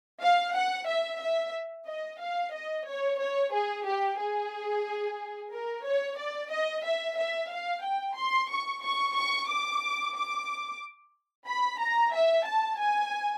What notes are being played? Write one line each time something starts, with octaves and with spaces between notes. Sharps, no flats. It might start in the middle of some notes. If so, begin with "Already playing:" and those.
F5
F#5
E5
E5
D#5
F5
D#5
C#5
C#5
G#4
G4
G#4
A#4
C#5
D5
D#5
E5
E5
F5
G5
C6
C#6
C#6
C#6
D6
D6
B5
A#5
E5
A5
G#5